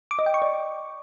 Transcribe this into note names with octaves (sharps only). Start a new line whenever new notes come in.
D6
D#5
G5
C#6
D5